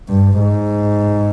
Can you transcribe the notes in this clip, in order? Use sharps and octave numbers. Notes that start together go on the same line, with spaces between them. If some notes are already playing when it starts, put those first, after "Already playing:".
G2
G#2